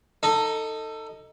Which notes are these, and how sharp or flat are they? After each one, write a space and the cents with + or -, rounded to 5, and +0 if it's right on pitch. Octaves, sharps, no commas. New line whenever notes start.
D#4 +5 A4 +20